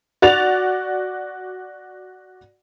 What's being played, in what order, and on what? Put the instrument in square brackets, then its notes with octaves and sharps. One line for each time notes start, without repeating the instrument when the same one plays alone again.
[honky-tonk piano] F#4 D5 A6 F7